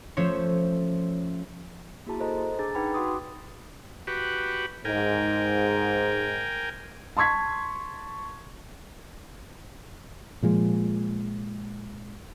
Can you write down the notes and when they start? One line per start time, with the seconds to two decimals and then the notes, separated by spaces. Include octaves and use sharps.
0.17 F3 A3 C#4 C5 C#5 E5
2.06 A#3 E4 F#4 G#4 A5 A#5
2.20 A4 C5 D#5 A#5
2.59 D4 G#4 A5 A#5 D6 A6
2.75 D#4 B4 F#5 G5 B5
2.94 F#4 F#5 C6 D6 D#6
4.07 F#4 G4 B4
4.85 G#2 A#4 G5 G#5
7.17 A5 C6 C#6 G#6 B6
10.43 A#2 F3 G#3